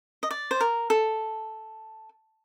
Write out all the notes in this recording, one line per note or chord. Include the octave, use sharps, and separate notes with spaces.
D#5
D5
C5
A#4
A4